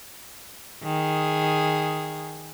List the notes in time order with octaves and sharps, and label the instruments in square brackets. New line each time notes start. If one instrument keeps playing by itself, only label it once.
[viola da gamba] D#3 G#4